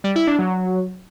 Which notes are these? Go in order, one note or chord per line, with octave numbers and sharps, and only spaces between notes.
G3
E4
D4
F#3